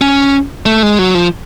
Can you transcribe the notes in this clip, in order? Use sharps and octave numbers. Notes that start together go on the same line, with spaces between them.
C#4
A3
G#3
F#3
F3